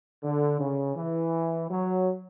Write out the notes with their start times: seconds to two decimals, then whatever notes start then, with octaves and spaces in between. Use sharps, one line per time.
0.22 D3
0.59 C#3
0.95 E3
1.70 F#3